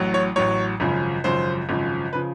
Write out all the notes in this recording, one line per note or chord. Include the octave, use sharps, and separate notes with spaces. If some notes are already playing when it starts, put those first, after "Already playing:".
Already playing: A1 A2 F#3
C#5
A1 A2 F#3 C#5
G#1 F#2 C#3 F3
G#1 F#2 C#3 F3 C5
G#1 F#2 C#3 F3
C#3 F3 B4